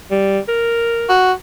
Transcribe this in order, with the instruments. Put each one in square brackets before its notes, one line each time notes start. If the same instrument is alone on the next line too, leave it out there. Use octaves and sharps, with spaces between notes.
[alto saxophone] G3
A#4
[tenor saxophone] F#4